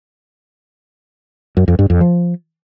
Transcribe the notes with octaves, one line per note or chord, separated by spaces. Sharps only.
F#2
F2
G2
F2
F3